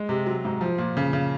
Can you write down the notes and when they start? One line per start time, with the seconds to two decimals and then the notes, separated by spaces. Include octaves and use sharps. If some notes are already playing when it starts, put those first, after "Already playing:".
Already playing: G#3
0.09 C3
0.26 F#3
0.45 G#2
0.61 F3
0.78 A#2
0.97 C#3
1.13 C#3